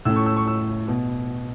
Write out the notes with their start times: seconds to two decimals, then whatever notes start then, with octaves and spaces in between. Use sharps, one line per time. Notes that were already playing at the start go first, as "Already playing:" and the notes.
0.05 A2 A3 C#4 E6
0.16 C#6
0.26 E6
0.37 C#6
0.47 E6
0.88 B2